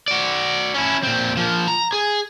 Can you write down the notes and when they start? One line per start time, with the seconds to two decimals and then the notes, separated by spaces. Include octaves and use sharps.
0.08 F#4 D5
0.74 C#4 E4
1.03 A#2 C4
1.37 F3 A#3
1.68 A#5
1.93 G#4